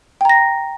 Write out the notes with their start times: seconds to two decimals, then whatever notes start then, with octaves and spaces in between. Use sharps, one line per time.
0.21 G5
0.25 A#5
0.29 A#6